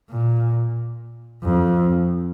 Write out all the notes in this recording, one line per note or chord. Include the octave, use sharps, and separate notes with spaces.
A#2
F2